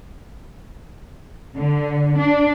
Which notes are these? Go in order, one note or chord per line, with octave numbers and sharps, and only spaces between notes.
D3
D4